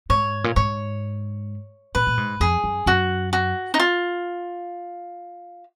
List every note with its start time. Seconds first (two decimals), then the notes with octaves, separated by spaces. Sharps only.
0.10 G#2 C#5
0.44 A#2
0.56 G#2 C#5
1.95 A#2 B4
2.07 A#2
2.18 G#2
2.40 F2 G#4
2.64 F#2
2.86 F#2 F#4
3.33 F#4
3.74 D#4
3.79 F4